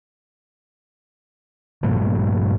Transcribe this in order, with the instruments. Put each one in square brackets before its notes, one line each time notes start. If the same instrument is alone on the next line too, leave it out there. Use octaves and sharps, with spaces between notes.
[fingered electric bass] G2 A#2 F3 A3